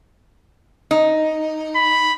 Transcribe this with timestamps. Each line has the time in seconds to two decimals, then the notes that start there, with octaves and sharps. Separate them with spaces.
0.91 D#4
1.76 B5